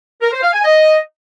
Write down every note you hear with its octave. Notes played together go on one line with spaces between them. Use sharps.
A#4
C5
F5
G#5
D#5